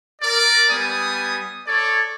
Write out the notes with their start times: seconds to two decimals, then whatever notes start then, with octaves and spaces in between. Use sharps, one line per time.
0.22 A#4 D5
0.70 G3 B3 G#5 D#6
1.67 A4 C#5 D5